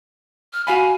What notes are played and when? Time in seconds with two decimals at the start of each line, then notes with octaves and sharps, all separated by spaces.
0.53 F6
0.67 F#4 F5 G#5 B5